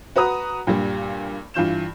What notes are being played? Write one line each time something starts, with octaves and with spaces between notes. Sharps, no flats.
F#4 B4 A#5 D#6
G2 A#2 G3
G2 E3 F4 G6 E7